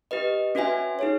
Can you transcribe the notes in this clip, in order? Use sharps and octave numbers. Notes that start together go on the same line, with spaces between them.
G4 B4 D#5
C#4 F#4 B4 E5 G#5
D#4 G#4 C#5